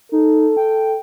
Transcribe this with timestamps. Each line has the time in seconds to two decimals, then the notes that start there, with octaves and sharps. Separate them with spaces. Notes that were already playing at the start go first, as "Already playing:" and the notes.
0.12 D#4 A4
0.57 G5